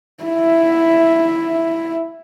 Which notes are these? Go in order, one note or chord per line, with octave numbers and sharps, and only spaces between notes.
E4 E5